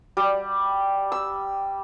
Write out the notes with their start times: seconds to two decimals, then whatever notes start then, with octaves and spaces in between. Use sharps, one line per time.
0.17 G3
1.12 E6